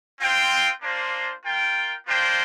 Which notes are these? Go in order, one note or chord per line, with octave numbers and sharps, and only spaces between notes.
C4 F4 C5 G5
A#3 D4 F4 C5
F4 A#4 G5
A#3 D4 F4 C5 G5